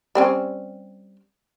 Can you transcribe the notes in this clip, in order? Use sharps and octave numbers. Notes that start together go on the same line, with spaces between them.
G3 C4 C#4